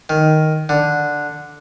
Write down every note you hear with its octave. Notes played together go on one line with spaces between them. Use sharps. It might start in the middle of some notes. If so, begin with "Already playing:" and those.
D#3
D3